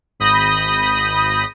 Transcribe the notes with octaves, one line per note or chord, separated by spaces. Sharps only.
G#1 B5 D#6 G6 A#6